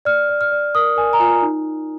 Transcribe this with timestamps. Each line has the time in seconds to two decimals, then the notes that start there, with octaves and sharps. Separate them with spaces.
0.05 D5 F6
0.29 D5
0.41 F6
0.52 D5
0.75 A#4 D#6
0.97 A#4 G#5
1.13 A#5
1.20 F4 G#5
1.42 D#4